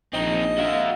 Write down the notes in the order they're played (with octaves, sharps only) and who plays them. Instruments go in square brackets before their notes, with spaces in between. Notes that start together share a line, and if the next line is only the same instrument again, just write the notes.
[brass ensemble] A#1 [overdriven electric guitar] C4 D#4 [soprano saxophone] D#5
[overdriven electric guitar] F#4 E5 [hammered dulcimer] F5